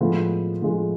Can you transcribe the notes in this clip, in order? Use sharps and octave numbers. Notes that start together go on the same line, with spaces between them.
A2 F3 G#3 B3
A2 F3 G#3 B3